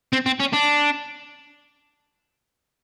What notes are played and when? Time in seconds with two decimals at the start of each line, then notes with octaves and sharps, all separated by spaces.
0.13 C4
0.26 C4
0.40 C#4
0.53 D4